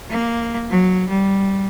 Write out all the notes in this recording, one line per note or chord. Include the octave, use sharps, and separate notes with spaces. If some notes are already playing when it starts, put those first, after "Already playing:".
A#3
F#3
G3